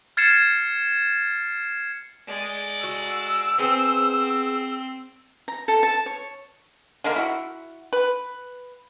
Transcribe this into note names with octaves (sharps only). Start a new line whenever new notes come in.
F6 G#6 A6 C7 C#7 E7
G#3 D5
F#4 E6
B3 C4 G#4 C5
A#5
A4
A5
C#5
D3 G#3 A#3 A#4
E4 F#4
B4